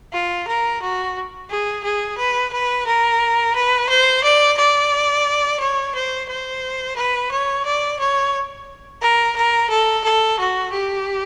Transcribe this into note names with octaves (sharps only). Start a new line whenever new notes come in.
F4
A#4
F#4
G#4
G#4
B4
B4
A#4
B4
C5
D5
D5
C#5
C5
C5
B4
C#5
D5
C#5
A#4
A#4
A4
A4
F#4
G4